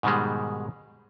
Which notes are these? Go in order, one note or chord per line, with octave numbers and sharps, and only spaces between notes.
G#2 B2 D#3 G3 G#3